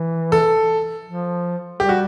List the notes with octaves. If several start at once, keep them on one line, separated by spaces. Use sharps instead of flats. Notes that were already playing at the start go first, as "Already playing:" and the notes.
Already playing: E3
A4
F3
G3 G4
F#4